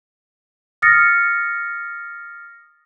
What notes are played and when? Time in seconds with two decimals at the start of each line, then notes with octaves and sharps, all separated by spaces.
0.82 D#6 F6 A6 A#6 C#7